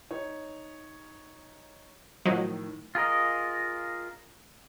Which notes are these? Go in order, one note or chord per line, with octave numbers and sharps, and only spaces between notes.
D#4 C#5
A2 D#3 F3 F#3 D#4
F4 G#4 A#4 D#5